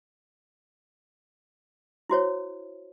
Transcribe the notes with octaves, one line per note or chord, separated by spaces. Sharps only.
E4 F#4 C5 C#5